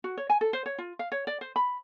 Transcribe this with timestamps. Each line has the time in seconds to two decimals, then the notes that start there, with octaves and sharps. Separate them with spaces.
0.04 F#4
0.17 C#5
0.30 G#5
0.41 A4
0.53 C5
0.66 C#5
0.78 F4
0.99 F5
1.12 C#5
1.27 D5
1.41 C5
1.56 B5